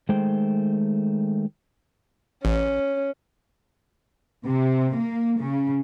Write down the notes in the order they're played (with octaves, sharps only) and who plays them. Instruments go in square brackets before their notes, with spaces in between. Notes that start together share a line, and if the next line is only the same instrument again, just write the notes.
[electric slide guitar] D#3 G#3 A3 G#4 C5 G5
[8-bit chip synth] A1 [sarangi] C#4
[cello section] C3
A#3
C#3